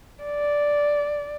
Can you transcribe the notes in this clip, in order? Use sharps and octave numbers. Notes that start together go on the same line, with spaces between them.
D5